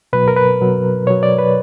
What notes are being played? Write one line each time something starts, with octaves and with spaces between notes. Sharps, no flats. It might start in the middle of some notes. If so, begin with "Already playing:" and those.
B2 F#3 B4
A#4
B4
B2 F#3
B2 F#3 C#5
D5
B4